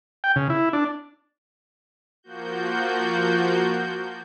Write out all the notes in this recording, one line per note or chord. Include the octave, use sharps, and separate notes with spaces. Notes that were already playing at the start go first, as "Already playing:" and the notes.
G5
C#3
E4
D4
F3 A#3 F#4 G6